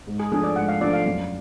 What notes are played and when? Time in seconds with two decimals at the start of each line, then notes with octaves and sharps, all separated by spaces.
0.07 G#2
0.20 G#4
0.31 F3 A3 D4 G#4
0.43 D5
0.56 G#2 F#5
0.68 F5
0.81 F3 A3 D4 D5
0.94 F5
1.06 F#2